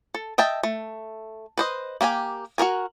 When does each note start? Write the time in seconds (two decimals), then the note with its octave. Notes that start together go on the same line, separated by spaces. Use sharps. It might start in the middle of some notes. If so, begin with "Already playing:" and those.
0.14 A4
0.38 D#5 E5 G5 A5
0.63 A3
1.58 B4 C5 D#5
2.01 A#3 G4 G5 G#5
2.58 F#4 G#4 A#4 G#5